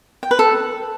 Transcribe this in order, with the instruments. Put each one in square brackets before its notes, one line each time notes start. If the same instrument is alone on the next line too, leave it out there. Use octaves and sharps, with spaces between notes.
[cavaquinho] G5
B4
A4